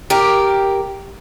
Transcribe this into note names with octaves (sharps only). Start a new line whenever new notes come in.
G4 A#4